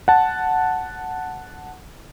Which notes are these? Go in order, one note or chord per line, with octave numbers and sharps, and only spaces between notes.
F#5 A5